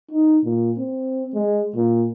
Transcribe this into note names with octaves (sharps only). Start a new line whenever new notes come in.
D#4
A#2
C4
G#3
A#2